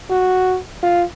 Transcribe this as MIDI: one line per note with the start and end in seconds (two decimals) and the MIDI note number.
0.11 0.57 66
0.83 1.02 65